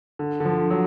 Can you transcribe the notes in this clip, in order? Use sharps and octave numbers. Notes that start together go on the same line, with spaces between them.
D3
D3
F3
F#3